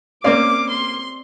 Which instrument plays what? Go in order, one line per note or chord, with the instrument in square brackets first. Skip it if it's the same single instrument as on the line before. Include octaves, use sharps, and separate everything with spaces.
[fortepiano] A#3 C#4 F5 [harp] C4 D5 [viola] D6
[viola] C6